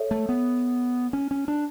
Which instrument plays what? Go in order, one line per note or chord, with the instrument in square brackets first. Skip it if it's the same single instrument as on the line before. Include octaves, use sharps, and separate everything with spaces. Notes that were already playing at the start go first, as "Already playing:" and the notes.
Already playing: [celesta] A4 C#5 E5
[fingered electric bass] A3
B3
C#4
C#4
D4